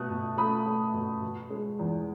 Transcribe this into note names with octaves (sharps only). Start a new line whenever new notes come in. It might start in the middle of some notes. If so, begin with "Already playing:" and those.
Already playing: B2 A3 D#6 F#6
B2
A3 B5 D#6
A3
B2
B2
G#3
E2